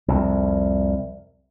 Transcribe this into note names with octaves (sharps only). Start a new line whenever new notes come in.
C2 F2